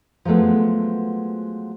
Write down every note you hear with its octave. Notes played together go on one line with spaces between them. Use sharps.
F3 F#3 G#3 A3 B3